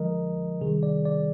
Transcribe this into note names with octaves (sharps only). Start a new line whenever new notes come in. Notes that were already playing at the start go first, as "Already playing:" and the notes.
Already playing: D3 F3 G#3 A#4 D#5
C3 D#3 G3 G#4
D5
D5